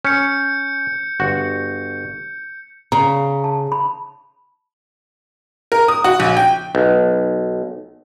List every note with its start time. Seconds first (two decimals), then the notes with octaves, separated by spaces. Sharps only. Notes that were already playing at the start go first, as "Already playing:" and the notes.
0.05 C#4 G6 C#7
1.20 G1 F#4 F#5
2.92 C#3 A#5
3.44 A5
3.72 A5 B5
5.72 A#4
5.88 D#6
6.04 F#4
6.20 A#1
6.37 G5
6.75 B1